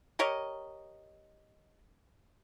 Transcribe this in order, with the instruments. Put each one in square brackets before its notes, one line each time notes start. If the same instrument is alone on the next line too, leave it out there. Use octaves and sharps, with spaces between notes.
[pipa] G4 A#4 C#5 D#5